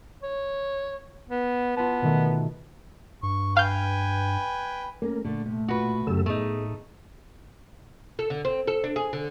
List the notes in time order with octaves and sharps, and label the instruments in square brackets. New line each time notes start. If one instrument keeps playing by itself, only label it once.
[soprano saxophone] C#5
B3
[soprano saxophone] B3 [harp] F4 A5
[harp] B2 D#3 A3
[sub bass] G2 [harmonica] C#6
[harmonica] B4 G5 G#5 [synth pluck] F5 G6
[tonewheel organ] A3 A#4 [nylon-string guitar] A#3 C#4
[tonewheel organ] A#2 [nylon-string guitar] D3 A3
[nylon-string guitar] C3 [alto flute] A3
[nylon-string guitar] F4 [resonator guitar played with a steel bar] F#4 B4
[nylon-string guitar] F#2 G4 [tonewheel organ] C#3 A4 E6
[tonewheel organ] A2 [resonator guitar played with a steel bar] A3 D#4 [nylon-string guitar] B3 [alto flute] G#4
[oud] A4
D3
C4
A4
D4
G#4
D3